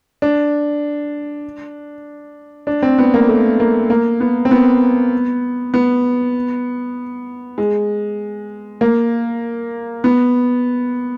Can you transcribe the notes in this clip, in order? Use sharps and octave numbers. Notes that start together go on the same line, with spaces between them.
D4
D4
C4
B3
A#3
A3
A#3
A#3
B3
C4
B3
B3
G#3
A#3
B3